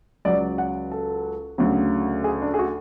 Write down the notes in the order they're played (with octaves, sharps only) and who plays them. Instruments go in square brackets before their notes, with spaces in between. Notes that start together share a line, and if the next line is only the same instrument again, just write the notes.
[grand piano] C#2 C#3 F#3 D5
F#5
A4
D2 C#3 F#3
G#4
D4
G#4
F#4